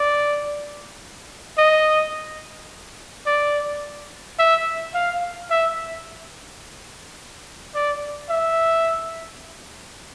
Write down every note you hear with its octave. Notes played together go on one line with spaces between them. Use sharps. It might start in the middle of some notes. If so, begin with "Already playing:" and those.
Already playing: D5
D#5
D5
E5
F5
E5
D5
E5